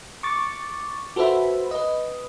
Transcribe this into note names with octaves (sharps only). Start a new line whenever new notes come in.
C#6 D6 A6
F#4 A4 B4 C5 E5 B5
B4 D#5